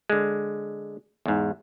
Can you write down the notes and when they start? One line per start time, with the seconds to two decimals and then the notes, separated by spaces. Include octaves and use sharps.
0.10 D3 G#3
1.26 E2 G#2